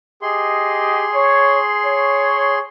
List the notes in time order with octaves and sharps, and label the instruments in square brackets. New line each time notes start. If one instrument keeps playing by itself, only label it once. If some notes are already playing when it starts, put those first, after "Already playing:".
[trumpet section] G4 D#5 [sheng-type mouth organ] G#4 C6
[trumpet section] C#5
C#5